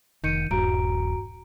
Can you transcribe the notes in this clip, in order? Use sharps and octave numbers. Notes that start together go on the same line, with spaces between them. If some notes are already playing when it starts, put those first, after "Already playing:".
F1 D#3 G6 C#7 D#7
D#1 G2 F#4 A#5 D7